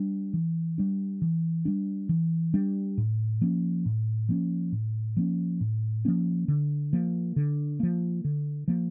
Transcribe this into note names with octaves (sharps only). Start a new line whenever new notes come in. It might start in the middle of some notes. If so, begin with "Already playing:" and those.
Already playing: G3 D4
E3
G3 D4
E3
G3 D4
E3
G3 D4
A2
F3 A#3 C#4
A2
F3 A#3 C#4
A2
F3 A#3 C#4
A2
F3 A#3 C#4
D3
F3 A#3
D3
F3 A#3
D3
F3 A#3